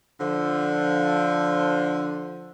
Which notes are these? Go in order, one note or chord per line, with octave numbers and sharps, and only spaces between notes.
D3 F3